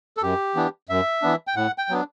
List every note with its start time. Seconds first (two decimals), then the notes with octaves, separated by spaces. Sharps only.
0.17 A4
0.22 F#2 G4
0.55 E3 B3 D4
0.89 F#2 E5
1.22 E3 B3 D4
1.47 G5
1.56 A2 F#5
1.78 G5
1.89 F#3 B3 D4